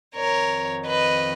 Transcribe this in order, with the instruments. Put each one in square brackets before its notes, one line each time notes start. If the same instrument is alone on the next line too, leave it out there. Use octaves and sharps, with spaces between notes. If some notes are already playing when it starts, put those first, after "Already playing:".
[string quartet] F2 D#3 A#4 C#5
B4 D#5